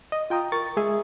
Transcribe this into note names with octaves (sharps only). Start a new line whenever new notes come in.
D#5
F4 G5 A#5 D#6
A#4 C#6 A6
G#3 G#4 E5 D#6